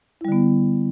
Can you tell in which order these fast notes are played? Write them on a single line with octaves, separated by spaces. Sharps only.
E4 G3 D3 B3